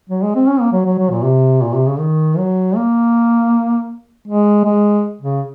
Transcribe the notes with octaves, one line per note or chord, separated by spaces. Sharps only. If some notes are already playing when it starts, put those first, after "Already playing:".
F#3
G#3
C4
C#4
A#3
F#3
F#3
F#3
A#2
C3
A#2
C3
C#3
D#3
F#3
A#3
G#3
G#3
C#3